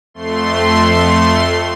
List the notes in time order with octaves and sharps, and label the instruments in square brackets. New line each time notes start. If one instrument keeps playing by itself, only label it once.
[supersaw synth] F2 A3 C6